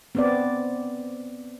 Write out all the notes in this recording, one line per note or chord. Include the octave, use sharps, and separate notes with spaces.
B3 C4 D5